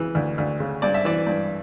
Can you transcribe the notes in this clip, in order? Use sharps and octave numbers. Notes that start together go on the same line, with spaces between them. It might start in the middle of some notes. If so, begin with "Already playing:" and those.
Already playing: C#3 E3
D2
D2
C#3
G2 D5
E5
E3 D5
G2